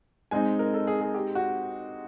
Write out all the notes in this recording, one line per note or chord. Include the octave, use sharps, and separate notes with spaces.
G#3 C4 D#4 G#5
A#4
A4
G#4
G#4
G4
F#4